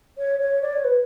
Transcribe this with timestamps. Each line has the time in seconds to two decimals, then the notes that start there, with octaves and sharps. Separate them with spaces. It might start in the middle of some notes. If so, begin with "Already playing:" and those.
0.17 C#5
0.39 C#5
0.62 D5
0.73 C#5
0.84 B4